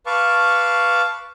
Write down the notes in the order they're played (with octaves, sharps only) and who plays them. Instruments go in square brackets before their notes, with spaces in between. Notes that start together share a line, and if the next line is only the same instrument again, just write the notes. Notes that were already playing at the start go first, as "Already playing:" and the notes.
[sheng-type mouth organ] B4 F5 A5 C#6 D6